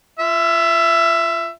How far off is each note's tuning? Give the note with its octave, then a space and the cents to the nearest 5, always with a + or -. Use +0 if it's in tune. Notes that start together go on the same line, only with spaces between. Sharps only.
F4 -30 E5 +15